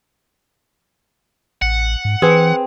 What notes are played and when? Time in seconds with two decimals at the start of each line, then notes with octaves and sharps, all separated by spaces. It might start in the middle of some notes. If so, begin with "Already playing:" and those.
1.62 A1 F#5
2.05 G#2
2.22 E3 C4 G#4 B4